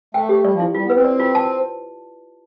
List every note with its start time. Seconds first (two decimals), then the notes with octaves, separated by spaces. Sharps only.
0.14 A3 G5
0.29 G4
0.44 G3 D5
0.54 F3
0.60 E4
0.75 G3 F4
0.85 B3
0.90 B4
0.95 C4
1.04 D5
1.20 F4
1.35 A5